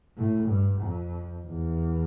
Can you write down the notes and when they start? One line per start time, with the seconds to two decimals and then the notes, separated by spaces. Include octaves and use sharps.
0.18 A2
0.49 G2
0.82 F2
1.46 E2